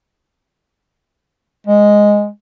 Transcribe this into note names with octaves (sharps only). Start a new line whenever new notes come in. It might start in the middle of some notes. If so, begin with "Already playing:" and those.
G#3